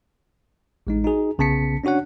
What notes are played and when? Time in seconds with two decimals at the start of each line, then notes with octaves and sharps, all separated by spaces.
0.87 A1 G#3 D#4
1.04 D#4 F#4 G#4
1.38 B1 C#3 B3 A5 B6 C#7
1.84 C#4 D4 F#4 C#5 F#5